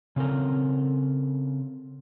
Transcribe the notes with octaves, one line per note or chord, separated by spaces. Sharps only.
C#3 C4 A4 A#4